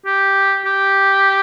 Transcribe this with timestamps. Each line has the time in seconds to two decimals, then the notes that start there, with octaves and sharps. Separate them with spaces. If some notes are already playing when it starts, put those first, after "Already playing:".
0.06 G4
0.65 G4